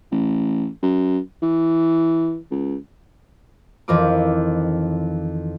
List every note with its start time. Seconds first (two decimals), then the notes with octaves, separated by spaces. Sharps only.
0.12 A1
0.83 F#2
1.43 E3
2.51 C#2
3.88 F2 D#3 E3 C4 F4 D6